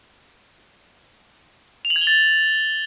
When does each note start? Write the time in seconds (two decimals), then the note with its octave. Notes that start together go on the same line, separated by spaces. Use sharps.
1.85 F7
1.90 F#7
1.96 G#6
2.01 G7
2.07 A6